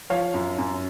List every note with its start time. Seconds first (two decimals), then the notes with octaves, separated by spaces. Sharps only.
0.10 F3 C#5 F5
0.34 F#2
0.58 F#2